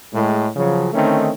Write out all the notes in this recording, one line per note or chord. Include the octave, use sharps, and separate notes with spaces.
A2 G#3
C#3 F3 F#3
D3 D#3 A3 C4 C#4 D#4